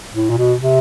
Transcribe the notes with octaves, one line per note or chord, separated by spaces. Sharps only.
A2
A#2
B2
C3